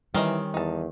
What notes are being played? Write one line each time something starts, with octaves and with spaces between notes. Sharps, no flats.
D#3 E3 G3 C4 C#4 D#5
E2 D#4 A5